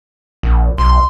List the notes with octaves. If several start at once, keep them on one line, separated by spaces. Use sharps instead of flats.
A#1
B1 C6